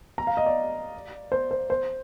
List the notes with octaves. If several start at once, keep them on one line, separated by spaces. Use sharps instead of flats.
A#5
F5
D#5
D5
C5
C5
C5